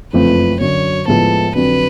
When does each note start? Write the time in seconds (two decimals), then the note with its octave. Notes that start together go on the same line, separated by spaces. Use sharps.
0.13 F#1 F2 F3 A3 F4 B4
0.60 F#2 D3 F#3 C#5
1.08 A2 F3 G#3 B3 A4
1.56 F2 D3 F#3 B4